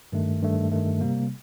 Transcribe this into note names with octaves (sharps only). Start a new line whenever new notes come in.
G2 D#3 A3
G2 D#3 A3
G2 D#3 A3
C3 G3 A#3